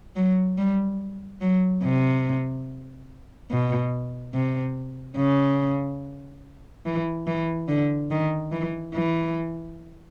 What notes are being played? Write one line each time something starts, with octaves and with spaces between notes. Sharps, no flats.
F#3
G3
F#3
C3
B2
C3
C#3
E3
E3
D3
D#3
E3
E3